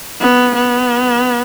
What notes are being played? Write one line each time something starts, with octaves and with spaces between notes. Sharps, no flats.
B3
B3